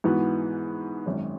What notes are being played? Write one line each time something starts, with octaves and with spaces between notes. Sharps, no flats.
G#2 E3 B3 F#4
G#1 F#2 F#3 C#4